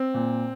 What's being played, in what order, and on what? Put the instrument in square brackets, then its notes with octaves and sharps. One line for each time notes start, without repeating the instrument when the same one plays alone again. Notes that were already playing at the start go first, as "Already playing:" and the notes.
Already playing: [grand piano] C4
A#2